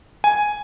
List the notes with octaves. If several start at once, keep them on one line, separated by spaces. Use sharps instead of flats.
G#5